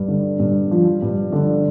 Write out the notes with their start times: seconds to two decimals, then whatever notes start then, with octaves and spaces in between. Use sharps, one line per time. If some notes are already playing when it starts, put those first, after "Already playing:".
Already playing: G2
0.08 D3
0.40 G2
0.71 F3
1.02 G2
1.32 D3